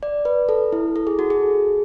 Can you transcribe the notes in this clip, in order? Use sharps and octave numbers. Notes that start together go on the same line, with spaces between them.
D5
B4
A4
E4
A4
G#4
F#4
G#4